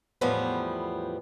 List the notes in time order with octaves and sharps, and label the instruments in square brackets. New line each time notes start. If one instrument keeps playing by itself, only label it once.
[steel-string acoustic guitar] E2 A2 F3 G3 B3